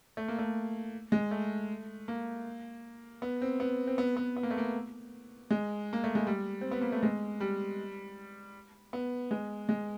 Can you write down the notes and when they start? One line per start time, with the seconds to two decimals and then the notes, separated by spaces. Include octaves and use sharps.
0.17 A3
0.28 A#3
0.39 A3
1.12 G#3
1.31 A3
2.08 A#3
3.22 B3
3.42 C4
3.60 B3
3.87 C4
3.98 B3
4.16 B3
4.36 B3
4.43 A#3
4.51 A3
4.58 A#3
5.51 G#3
5.93 A#3
6.04 A3
6.15 G#3
6.27 G3
6.61 C4
6.71 B3
6.81 A#3
6.92 A3
7.03 G#3
7.40 G3
8.93 B3
9.31 G#3
9.69 G#3